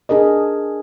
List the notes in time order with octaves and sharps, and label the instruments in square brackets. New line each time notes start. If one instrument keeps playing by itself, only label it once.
[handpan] D4 G#4 A#4 D#5